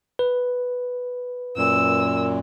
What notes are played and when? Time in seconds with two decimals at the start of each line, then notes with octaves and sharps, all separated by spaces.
0.19 B4
1.57 F#2 A#2 E6